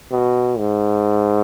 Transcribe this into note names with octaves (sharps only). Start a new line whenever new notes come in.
B2
G#2